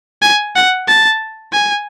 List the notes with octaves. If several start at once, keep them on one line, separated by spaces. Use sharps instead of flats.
G#5
F#5
A5
G#5